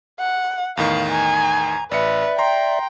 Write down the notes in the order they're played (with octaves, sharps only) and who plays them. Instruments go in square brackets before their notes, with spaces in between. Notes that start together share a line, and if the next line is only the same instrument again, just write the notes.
[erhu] F#5
[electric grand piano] E2 A2 D#3 [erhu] F5
[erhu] G#5 [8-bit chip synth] A#5
[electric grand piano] A1 C#7 [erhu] B4 [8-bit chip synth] D5 E5
[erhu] G5 [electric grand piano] A#5 C6